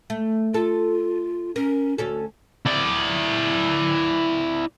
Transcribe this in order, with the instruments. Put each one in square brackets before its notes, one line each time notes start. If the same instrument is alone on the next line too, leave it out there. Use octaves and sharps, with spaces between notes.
[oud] A3
[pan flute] F4 [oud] A4
[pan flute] C#4 [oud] A#4
[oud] D2 C#4 A4 [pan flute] F#4
[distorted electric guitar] E4 D5